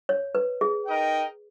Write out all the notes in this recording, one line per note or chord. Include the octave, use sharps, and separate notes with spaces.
C#5
B4
G#4
D#4 A#4 D#5 G5